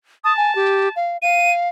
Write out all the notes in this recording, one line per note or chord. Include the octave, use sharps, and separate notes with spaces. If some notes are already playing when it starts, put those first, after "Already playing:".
A5 D#6
G#5
G4
F5
F5 D#7